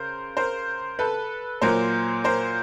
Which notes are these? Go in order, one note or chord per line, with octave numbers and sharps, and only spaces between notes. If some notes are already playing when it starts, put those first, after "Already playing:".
Already playing: C#3 A#4 C5
A#4 C5
A4 B4
A#2 F#3 A#4 C5
A#4 C5